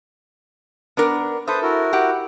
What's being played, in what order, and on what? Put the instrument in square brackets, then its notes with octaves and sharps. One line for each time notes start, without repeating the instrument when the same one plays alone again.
[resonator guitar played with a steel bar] B3 D4 A#4
[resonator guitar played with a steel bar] A4 E5 [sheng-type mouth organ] B4 C5 D#6
[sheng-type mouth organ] E4 F#4 A#4
[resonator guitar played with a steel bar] G4 F#5